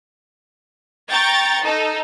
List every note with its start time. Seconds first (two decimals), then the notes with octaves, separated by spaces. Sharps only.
1.12 G5 A#5 C#6 G6 A6
1.64 D#4 A4